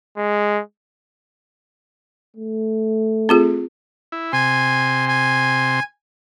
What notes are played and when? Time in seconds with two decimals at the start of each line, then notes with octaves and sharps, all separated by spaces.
0.17 G#3
2.37 A3
3.29 C4 F4 G#4
4.12 E4
4.33 C3 G#5 C6
5.08 G#5